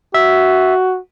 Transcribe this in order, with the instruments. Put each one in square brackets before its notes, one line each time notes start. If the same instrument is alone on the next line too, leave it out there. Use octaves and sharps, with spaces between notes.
[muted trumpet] F#4 [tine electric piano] E5